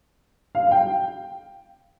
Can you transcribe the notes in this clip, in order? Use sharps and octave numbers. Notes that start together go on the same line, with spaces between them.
F5
F5
G5